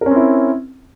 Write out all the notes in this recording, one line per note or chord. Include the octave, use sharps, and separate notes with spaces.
C4 C#4 E4 A#4